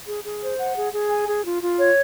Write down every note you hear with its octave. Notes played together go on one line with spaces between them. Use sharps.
G#4
G#4
C5
F#5
G#4
G#4
G#5
G#4
F4
F4
C#5